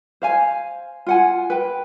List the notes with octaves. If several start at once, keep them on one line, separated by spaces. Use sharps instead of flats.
C5 F5 G#5
F4 F#5 G#5
B4 G5